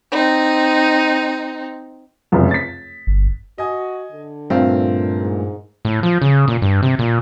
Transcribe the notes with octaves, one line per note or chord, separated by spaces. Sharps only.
C4 D#4
F1 C#2 F#2
A6 B6
G1
F#4 D#5 G#5
D3
G2 A#2 A3 C4 F5
G#2
A2
F3
C#3
A#2
G2
C3
A#2